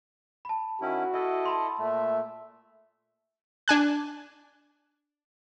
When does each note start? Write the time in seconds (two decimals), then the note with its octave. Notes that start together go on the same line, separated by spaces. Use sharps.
0.45 A5 B5
0.81 D#3 C#4 E4 F#4
1.14 E4 A4 D#5 E5
1.46 A5 B5 C6
1.79 A#2 A3 E5
3.68 D4 G#5 F#6